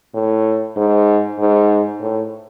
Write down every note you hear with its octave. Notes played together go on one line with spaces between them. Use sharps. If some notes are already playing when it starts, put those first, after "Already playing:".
A2
G#2
G#2
A2